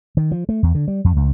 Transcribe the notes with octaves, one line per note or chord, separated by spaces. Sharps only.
D#3
F3
A3
E2
D3
G3
F2
C#2